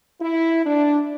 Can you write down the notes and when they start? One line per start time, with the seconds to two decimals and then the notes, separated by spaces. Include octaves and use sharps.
0.21 E4
0.66 D4